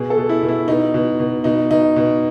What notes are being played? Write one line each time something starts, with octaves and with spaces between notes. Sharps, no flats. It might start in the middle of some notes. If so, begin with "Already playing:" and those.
Already playing: B2 G#4
A4
B2
E4
B2
E4
B2 D#4
B2
B2
B2 D#4
B2 D#4
B2